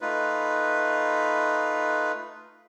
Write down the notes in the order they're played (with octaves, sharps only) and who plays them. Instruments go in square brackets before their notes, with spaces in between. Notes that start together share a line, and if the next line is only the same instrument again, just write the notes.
[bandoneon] A3 D#4 F4 B4